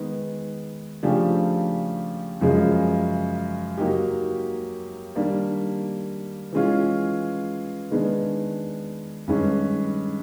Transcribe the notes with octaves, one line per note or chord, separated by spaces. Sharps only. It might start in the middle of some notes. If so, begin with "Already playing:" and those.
Already playing: D#3 G#3 B3
C#3 F3 A3 D4 G4
F#2 C#3 F3 G#3
F#3 A#3 D#4 G4
D#3 G3 A#3 D4
E3 G#3 C#4 F4
D#3 G#3 B3 D4
G2 D#3 G#3 C#4